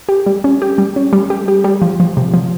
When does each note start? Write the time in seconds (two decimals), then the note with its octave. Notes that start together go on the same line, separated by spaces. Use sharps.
0.09 G4
0.26 G3
0.44 C#4
0.62 G4
0.78 G3
0.96 C#4
1.13 G3
1.30 G4
1.48 G4
1.64 G3
1.82 F3
2.00 F3
2.17 C3
2.34 F3